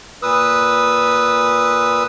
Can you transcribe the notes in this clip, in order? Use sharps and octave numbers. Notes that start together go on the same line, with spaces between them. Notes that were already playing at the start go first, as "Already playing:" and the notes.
A#2 B4 D#6 E6